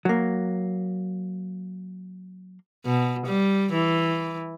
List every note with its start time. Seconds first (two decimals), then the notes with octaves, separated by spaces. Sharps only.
0.05 F#3 A#3
2.85 B2
3.26 G3
3.72 E3